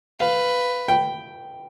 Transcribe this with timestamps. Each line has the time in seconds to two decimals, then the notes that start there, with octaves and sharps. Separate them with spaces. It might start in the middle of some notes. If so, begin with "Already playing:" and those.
0.20 B4 F5
0.88 G5